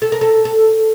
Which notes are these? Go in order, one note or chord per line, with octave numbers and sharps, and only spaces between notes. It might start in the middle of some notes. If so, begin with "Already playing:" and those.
A4
A#4
A4
A4